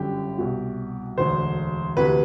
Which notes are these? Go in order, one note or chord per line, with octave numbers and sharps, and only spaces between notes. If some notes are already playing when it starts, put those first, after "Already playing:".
Already playing: G1 F#2 D3 G4
C2 B2
E1 D2 D3 C5
D2 C3 E3 B4